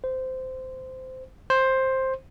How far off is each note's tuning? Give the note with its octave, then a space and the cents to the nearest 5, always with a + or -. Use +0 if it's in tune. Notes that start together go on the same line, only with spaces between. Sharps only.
C5 -15
C5 +10